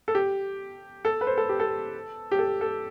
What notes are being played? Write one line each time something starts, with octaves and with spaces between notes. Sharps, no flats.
A4
G4
A4
B4
C5
A4
G4
A4
G4
A4
A4